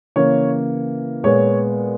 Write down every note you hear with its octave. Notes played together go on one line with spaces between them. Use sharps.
C#3 E3 A#3 C#5
A#2 G#3 B3 C#5